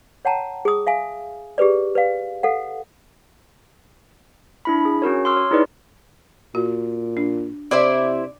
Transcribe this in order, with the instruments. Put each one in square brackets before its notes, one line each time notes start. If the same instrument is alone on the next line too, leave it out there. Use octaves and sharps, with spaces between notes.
[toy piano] C#5 F#5 G5 A5 A#5
G#4 D#6
E5 F5 G#5
G4 G#4 B4 D5
B4 D5 F5
A4 F5 F#5
[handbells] D4 E4 B5
G#4
C#4 F#4 A#4 C#5
C6 D6 E6 F6
C#5
D#4 E4 G#4 B4 C#5 D5
[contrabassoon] A#2 [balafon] F#4
[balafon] D4
[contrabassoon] C3 [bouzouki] E4 C5 E5 [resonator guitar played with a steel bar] D5